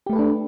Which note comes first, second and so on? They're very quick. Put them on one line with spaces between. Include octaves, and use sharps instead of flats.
G4 A3 B4 A4 D4